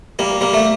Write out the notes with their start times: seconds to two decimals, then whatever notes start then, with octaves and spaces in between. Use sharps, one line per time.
0.19 G3 A#3
0.41 G3 A#3
0.54 A3